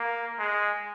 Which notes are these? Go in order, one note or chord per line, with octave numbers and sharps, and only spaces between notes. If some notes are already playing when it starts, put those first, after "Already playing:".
Already playing: A#3
G#3